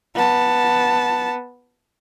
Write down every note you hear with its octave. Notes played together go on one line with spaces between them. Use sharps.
B3 A5